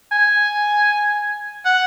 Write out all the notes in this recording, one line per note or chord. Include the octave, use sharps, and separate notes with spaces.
G#5
F#5